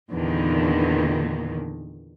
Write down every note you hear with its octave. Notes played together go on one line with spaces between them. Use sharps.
E2 A#2 D3 D#3